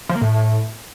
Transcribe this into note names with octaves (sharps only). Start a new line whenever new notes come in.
F3
A#3
A2